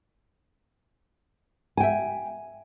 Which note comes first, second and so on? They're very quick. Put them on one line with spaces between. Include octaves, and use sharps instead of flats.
G#5 G5 E5